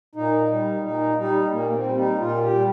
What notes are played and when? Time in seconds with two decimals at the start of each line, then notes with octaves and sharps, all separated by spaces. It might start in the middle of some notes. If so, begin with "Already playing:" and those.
0.15 A#2 D#4
0.50 G3
0.83 A#2 D#4
1.17 G3 D#4
1.51 A#2 A#3
1.70 A#3
1.74 C4
1.86 G3
1.97 D#4
2.20 A#2 F4
2.43 G4
2.54 G3